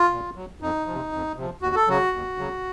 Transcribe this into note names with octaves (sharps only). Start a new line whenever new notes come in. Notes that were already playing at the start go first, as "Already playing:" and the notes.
Already playing: F4
A#2
F#3
F2 D#4
C3 F3
F2
C3 F3
D#2 F#4
A4
C#3 F#3 F#4
D#2
C#3 F#3